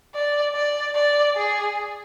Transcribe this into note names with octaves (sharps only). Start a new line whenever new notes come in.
D5
D5
D5
G#4